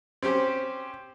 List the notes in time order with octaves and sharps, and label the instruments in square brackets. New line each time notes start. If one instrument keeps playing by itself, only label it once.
[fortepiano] C4 C#4 G4 C5